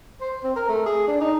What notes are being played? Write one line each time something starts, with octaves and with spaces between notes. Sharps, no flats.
C5
C4
A#4
A3
G#4
D4
D#4